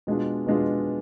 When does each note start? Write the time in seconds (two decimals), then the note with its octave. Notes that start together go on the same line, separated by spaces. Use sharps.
0.07 B2 G#3 D4 F4
0.47 B2 G#3 D4 F4